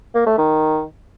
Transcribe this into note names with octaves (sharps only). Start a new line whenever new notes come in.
A#3
A3
D#3